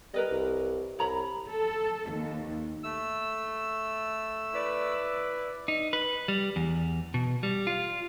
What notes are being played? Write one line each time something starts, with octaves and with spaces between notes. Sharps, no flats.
G3 A#4 B4 D#5
C2
C2 C#5 A#5 B5
A4
D#2
A3 E6
E4 B4 D5
D#4
B4
G3
E2
B2
G3
F4